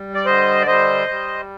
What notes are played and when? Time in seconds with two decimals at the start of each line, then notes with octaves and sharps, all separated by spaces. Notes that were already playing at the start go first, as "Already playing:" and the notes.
Already playing: G3
0.14 D5
0.25 D3 C5 D#5
0.62 D5
0.67 G3 C5 D#5
1.08 G3